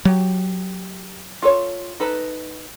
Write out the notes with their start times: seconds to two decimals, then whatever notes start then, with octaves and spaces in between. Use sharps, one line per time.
0.05 F#3 G4
1.42 F4 A4 C#5
2.00 D#4 A4 B4